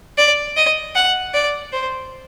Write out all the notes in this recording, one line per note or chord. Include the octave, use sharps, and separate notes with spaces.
D5
D#5
F#5
D5
C5